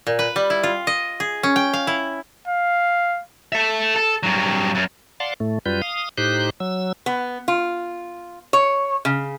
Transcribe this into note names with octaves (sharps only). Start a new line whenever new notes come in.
A#2
B4
G3
E4
F4
D#5
G#4
C#4
G5
F5
E4
F5
A4 E5
A4
G2 F#3
F#2
D5 F5 F#5 A5 C6
A2 A3
F#2 G3 F4 B4 G6
F5 D#6
A2 D#4 G4 C5 F#6 G6
F#3 E6
B3
F4
C#5
C#3